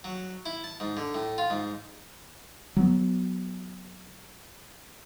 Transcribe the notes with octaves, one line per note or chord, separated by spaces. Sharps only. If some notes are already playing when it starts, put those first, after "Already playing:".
F#3
E4
A5
G#2
D3
A2
F4
G#2
F#3 B3